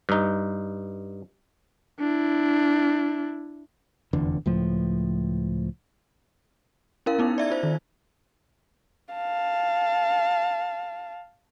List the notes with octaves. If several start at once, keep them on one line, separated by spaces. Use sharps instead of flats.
G2 D#4
D4 E4
F1 E2 D3
C#2 A2 F3
C#4 E4 A#4 F5
B3 D#4 E4
D5 E5 G#6
F4 C5
D#3
F5 A5